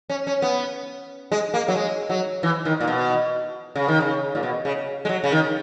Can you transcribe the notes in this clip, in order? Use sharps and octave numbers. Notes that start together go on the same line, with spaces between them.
C#4
C#4
B3
G#3
A#3
F#3
G#3
F#3
E3
D#3
A#2
B2
C#3
D#3
C#3
A#2
B2
C#3
G#3
F#3
C#3
D#3